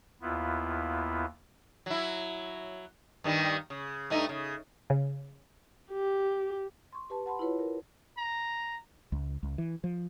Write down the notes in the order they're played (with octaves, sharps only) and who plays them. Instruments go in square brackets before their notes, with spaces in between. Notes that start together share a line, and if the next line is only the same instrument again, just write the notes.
[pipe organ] D#2 B3 E4 F4
[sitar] F#3 E4
G2 D#3 G3
C#3
G2 A3 D#4
C#3
[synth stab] C#3
[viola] G4
[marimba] C6 C#6
G4 B4 A5
F#5 A5 B5 C6
E4 F4 B4 C#5
A#4
[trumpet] A#5
[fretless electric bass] C#2
C#2
E3
F3